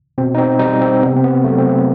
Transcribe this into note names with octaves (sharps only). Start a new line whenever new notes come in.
B2 C4
D#4
C4
G3 D#4
C4
C3 B3
C4
B3
F#3 A3
C4
B3